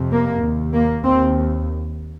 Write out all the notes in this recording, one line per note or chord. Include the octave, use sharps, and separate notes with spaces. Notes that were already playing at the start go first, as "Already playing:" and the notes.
Already playing: F2 C3
A#3
D#2
A#3
D#2 C4